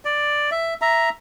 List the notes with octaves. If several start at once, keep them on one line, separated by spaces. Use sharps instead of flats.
D5
E5
E5 A#5